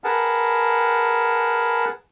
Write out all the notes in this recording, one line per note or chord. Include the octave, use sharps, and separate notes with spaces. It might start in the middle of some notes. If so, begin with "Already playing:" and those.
G#4 A#4 B4 F#5 A5